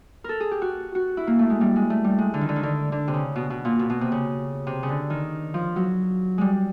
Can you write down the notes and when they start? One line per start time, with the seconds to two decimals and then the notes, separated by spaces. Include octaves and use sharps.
0.24 A4 A#4
0.40 G#4
0.51 G4
0.62 F#4
0.95 F#4
1.17 E4
1.27 A#3
1.39 A3
1.50 G#3
1.61 G3
1.76 G#3
1.90 A3
2.04 G3
2.19 G#3
2.34 D3
2.41 D#3
2.49 D3
2.56 D#3
2.63 D3
2.92 D3
3.08 C3
3.14 C#3
3.36 B2
3.50 B2
3.65 A#2
3.79 B2
3.90 B2
4.01 C3
4.12 C#3
4.67 C3
4.83 C#3
4.89 D3
5.10 D#3
5.54 F3
5.76 F#3
6.38 G3 G#3